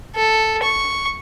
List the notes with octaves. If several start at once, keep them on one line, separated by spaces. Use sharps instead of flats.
A4
C#6